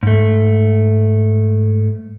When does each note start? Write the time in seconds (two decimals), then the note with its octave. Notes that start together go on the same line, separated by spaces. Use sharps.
0.03 G#2 A3